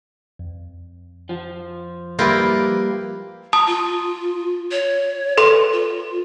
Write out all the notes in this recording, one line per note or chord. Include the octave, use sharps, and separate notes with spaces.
F2
F3
G3 A#3 E4 F4 G4 B4 D5 G5
A5 A#5 D#6
F4
C#5
A4 B4 C6
F4